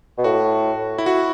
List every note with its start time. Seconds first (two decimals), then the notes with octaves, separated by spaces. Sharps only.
0.18 B2
0.24 A2 F#4
0.98 E4
1.06 F#4